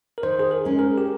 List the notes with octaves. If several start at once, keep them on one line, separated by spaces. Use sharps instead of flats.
A#4
D#3 C5
G#4
A#4
G#3 C#4
A#4
G4